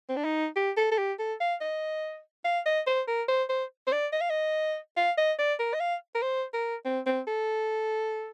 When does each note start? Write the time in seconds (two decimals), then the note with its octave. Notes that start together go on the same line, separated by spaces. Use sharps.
0.09 C4
0.16 D4
0.24 D#4
0.56 G4
0.77 A4
0.91 A4
0.98 G4
1.19 A4
1.40 F5
1.61 D#5
2.45 F5
2.66 D#5
2.86 C5
3.08 A#4
3.28 C5
3.49 C5
3.87 C5
3.92 D5
4.12 D#5
4.21 F5
4.30 D#5
4.97 F5
5.17 D#5
5.39 D5
5.59 A#4
5.74 D#5
5.80 F5
6.15 A#4
6.22 C5
6.53 A#4
6.85 C4
7.06 C4
7.27 A4